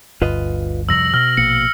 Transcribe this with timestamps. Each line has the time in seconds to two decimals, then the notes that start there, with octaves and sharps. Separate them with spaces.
0.22 G1 D2 G2 F4 B4 D#5
0.89 C2 F2 E6 A#6 F#7
1.14 B2 F6 A#6
1.37 A#1 A#3 C#7